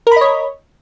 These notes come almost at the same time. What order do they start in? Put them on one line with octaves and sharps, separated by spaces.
A#4 B5 D#5 C#5